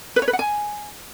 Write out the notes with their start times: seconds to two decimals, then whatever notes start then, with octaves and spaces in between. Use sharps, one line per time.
0.16 B4
0.22 C#5
0.28 B4
0.33 F#5
0.39 G#5